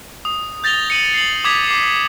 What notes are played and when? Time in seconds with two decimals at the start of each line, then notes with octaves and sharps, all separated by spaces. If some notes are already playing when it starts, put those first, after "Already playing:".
0.25 D#6
0.64 G6 A6 A#6 F7 G7
0.90 C#7 D#7 F#7
1.14 C7 F#7
1.44 D6 D#6 G#6 B6
1.68 D6 C7